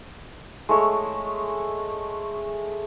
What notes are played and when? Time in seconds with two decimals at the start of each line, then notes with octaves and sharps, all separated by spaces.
0.69 G#3 A3 C#5 E5